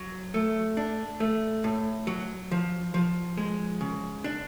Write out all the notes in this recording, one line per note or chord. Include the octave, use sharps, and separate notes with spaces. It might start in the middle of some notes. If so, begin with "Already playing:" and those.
Already playing: F#3
A3
D4
A3
A2
F#3
F3
F3
G#3
C#3
D4